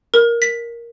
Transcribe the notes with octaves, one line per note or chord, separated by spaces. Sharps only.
A#4
B6